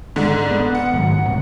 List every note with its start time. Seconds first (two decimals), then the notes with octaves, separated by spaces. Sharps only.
0.16 G#2 D3
0.51 B3
0.75 F#5
0.93 G#2 D#3 F#3
1.24 C2 A2 C3